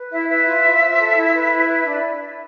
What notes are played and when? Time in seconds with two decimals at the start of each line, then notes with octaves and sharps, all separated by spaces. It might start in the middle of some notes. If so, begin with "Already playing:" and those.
Already playing: B4
0.11 E4 E5
0.29 B4 E5
0.47 F4
0.64 F4
0.81 C5
0.99 A4
1.15 E4
1.33 B4
1.51 E4
1.68 B4
1.85 D4 D5